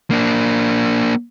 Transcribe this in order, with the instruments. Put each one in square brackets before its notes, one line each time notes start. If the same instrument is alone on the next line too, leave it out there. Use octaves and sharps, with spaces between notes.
[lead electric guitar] A#3 D4